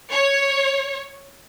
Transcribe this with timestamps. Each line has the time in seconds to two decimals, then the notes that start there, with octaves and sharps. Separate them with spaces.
0.11 C#5